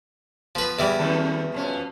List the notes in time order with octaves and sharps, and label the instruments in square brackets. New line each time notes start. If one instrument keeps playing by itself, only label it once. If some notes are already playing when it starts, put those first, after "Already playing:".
[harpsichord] F3 B4 [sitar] B3
[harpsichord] E2 E3 G3
[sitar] F2 D#3 A4
B2 F3 C#4